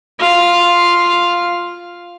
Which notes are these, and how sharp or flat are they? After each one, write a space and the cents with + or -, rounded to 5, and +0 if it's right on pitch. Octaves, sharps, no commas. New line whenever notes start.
F4 +0 F5 +0